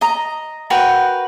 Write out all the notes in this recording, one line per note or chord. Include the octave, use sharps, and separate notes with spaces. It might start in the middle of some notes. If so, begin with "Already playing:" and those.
D#5 A#5
F#4 A#4 B4 G5